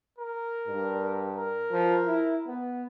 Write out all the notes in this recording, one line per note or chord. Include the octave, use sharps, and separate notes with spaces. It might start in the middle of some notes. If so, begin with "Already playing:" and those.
A#4
G2
A#4
F3
E4
B3